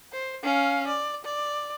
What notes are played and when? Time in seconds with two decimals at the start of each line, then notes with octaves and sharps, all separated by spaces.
0.13 C5
0.44 C#4 F5
0.88 D5
1.25 D5